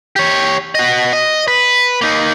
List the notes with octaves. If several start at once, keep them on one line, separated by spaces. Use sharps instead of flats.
G4 C#5
F#4 D#5
D#5
B4
A#3 D#4